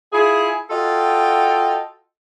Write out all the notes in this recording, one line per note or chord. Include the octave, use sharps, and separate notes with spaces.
E4 F4 G#4
F4 F#4 A4 D#5 G5